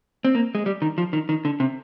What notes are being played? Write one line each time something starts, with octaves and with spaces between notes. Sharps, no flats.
C4
A#3
G#3
G3
D#3
F3
D#3
D#3
D3
C3